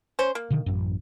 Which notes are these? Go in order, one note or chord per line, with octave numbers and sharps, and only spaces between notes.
C#4 C5
A#3
B2 D3 D#3
A1 F#2